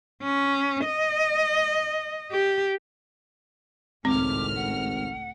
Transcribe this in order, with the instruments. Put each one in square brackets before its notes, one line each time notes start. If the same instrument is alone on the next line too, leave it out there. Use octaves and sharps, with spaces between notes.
[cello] C#4
D#5
G4
[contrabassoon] G#1 [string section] C#2 A2 F6 [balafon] C4 [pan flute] D6
[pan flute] F#5